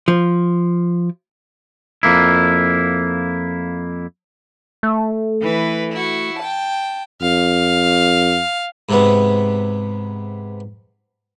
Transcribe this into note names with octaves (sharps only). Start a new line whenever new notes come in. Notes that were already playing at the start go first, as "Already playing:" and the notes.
F3
F2 A#3 E4
A3
E3 B4
E4 F#4
G5 A5
F2 F5
G#2 C3 B3